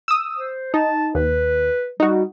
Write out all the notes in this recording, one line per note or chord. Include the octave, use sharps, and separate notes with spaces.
D#6 E6
C5
D#4 A5
D#2 B4
G3 D#4 F#4